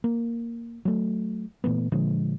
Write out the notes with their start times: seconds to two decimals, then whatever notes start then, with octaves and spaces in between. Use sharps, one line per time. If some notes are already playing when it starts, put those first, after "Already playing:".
0.04 A#3
0.85 F#3 A3
1.64 A#2 E3 A3 B3
1.92 A#2 D3 F3 G#3